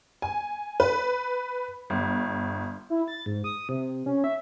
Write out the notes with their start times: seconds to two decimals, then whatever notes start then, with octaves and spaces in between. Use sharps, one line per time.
0.22 G#5
0.80 B4
1.90 G1
2.90 E4
3.08 A6
3.26 G#2
3.44 D#6
3.69 C3
4.06 C#4
4.24 E5